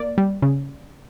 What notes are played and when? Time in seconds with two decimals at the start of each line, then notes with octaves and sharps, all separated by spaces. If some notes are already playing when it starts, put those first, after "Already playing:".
Already playing: A#3 D5
0.18 G3
0.42 C#3